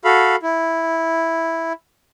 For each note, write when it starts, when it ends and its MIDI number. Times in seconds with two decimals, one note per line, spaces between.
0.05 0.36 66
0.05 0.36 69
0.05 0.36 77
0.05 0.36 83
0.43 1.73 64